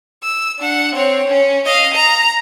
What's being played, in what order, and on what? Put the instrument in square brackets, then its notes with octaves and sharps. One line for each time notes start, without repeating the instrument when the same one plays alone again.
[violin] E6
D4 F#5
C4 C#5
C#4
D#5 F5
A#5